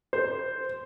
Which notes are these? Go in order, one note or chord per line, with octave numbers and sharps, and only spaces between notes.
C5